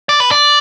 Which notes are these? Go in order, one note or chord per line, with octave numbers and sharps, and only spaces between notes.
D5
B4
D5